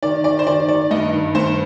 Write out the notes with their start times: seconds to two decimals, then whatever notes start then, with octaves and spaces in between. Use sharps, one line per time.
0.03 D#3 D5
0.24 D#3 D5
0.39 C5
0.47 D#3 D5
0.68 D#3 D5
0.91 G2 D#5
1.13 D#3
1.35 G2 C5